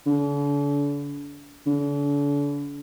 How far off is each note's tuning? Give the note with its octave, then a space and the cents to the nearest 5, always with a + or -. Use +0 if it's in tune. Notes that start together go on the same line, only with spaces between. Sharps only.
D3 -40
D3 -40